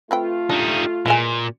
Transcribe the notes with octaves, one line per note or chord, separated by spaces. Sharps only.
A3 C4 F4 B4 G5
G3 D4 D#4
A#2 E3 G#3 G#5